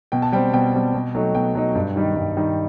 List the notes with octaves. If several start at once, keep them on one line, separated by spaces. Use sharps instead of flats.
B2 G5
A5
G3 C4 G5
B2 G5
G3 C4
B2
F#3 A3 D#4
B2 G5
F#3 A3 D#4
G2
D#3 G3 D#4
G2
D#3 G3 D#4